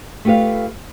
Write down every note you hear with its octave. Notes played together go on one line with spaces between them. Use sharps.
A3 F4 G4 B4 F5